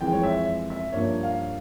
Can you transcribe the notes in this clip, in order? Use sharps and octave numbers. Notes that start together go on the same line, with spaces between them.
F2 E3 G#3 G5
C#5
E5
E5
G2 F3 A#3 C#5
F5